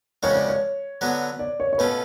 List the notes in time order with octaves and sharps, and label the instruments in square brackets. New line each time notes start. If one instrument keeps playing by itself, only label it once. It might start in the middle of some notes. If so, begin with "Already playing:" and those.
[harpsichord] F2 C#3 G#3 C#4 F#4 [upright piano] C#5
[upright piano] D5
C#5
[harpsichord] D3 F#3 B3 F#4
[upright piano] D5
C#5
C#5
[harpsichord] B2 A3 C#4 F4 [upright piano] B4